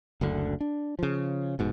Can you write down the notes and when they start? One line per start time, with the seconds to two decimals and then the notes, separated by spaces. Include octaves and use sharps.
0.21 F#1 D2 D3
0.61 D4
0.99 C#3 F3
1.59 F1 G#2 B2